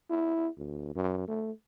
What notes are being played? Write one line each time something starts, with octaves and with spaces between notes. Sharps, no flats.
E4
D2
F#2
A3